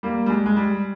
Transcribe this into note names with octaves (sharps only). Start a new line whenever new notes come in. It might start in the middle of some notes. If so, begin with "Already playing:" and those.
G3 A#3
G3
G#3
G#3
G3